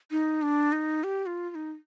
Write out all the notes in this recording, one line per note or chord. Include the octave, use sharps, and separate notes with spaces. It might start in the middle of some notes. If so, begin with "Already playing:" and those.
D#4
D4
D#4
G4
F4
F4
D#4